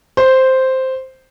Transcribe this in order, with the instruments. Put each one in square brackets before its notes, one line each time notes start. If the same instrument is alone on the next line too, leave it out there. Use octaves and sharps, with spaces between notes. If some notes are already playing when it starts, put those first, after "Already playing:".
[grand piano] C5